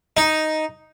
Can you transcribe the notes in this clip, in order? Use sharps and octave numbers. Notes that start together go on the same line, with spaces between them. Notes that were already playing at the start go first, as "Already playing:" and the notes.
D#4